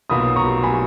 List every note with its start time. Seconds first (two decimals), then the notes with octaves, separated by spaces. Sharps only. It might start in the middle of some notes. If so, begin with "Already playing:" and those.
0.10 B1 B2 F#3 A#3 F4 B5 D#6
0.36 A#5 C#6
0.63 G#5 B5